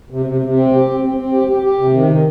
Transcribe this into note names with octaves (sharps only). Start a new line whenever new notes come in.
C3
C3
C3
C4
G4
C4
C4
C4
G4
G4
G4
C3
D#3